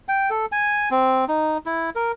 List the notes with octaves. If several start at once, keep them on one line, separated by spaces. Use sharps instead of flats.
G5
A4
G#5
C4
D#4
E4
A#4